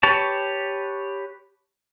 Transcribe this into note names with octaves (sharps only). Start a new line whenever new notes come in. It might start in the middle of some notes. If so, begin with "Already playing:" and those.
G4 B4 C#5 A5